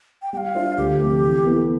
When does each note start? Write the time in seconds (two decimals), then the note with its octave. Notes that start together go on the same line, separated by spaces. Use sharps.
0.22 G5
0.33 G3 G5
0.37 F5
0.55 D4 F4 C5 E5
0.77 D2 G4
1.00 C3 F3 A3
1.22 E3
1.44 B3 E4 A4